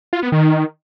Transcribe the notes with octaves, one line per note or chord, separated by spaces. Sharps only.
F4
B3
D#3